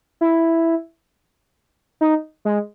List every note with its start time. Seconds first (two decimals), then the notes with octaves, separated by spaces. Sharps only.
0.21 E4
2.01 D#4
2.45 G#3